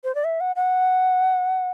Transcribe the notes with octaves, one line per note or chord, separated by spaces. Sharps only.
C5
D5
E5
F#5
F#5